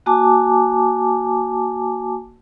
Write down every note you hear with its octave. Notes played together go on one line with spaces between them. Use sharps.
A#3 F#4 G#5 A5 D6